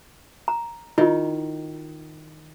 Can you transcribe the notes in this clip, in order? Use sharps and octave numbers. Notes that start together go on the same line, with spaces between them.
A#5
D#3 E4 F4